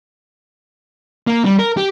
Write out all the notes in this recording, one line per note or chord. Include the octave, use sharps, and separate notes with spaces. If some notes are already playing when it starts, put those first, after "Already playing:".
A#3
G3
A#4
G4